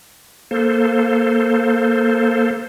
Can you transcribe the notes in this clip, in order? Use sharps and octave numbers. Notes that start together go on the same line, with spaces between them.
A#3 A4 C5